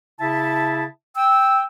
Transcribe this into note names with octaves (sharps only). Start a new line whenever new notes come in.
C#3 E4 E5 A5
G5 E6